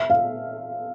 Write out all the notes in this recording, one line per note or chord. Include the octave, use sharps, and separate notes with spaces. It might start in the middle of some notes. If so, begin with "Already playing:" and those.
Already playing: E5
F5